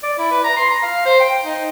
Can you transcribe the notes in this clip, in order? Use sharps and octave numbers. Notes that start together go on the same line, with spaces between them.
D5
E4
B4
A#5
C6
A#5
F5
C5
G5
D#4